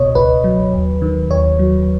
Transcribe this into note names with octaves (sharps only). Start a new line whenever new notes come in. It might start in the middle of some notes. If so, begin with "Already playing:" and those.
Already playing: C#2 B2 C#5 D#5
C#2 B4
F#3
D#2
D#3
D#2 C#5
F#3